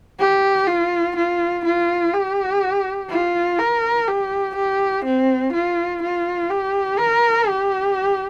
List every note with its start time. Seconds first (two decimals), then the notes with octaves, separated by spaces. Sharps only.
0.19 G4
0.67 F4
1.16 F4
1.65 F4
2.14 G4
3.10 F4
3.59 A#4
4.08 G4
4.56 G4
5.05 C4
5.53 F4
6.03 F4
6.50 G4
6.99 A#4
7.48 G4